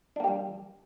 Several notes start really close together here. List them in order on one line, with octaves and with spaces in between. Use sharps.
D4 A#3 G4 G3